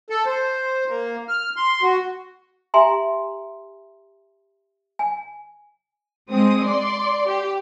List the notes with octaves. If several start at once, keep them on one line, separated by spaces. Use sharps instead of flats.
A4
C5
A#3
F6
C6
F#4
G4 E5 G#5 A#5 C6
G#5
G#3 C4 D#6
D5 C6
G4